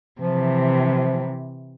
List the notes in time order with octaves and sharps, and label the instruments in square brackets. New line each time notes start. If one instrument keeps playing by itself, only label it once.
[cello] C3 E3 [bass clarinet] F3